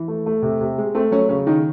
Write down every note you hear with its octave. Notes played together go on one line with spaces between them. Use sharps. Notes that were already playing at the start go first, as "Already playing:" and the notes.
Already playing: E3
A3
A3
C3
C3
G#3
A3 C4
F#3 C#4
C#3 C#4
D#3 D#4